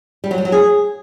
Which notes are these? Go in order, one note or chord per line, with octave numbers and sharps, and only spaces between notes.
G3
F#3
G3
F#3
G#4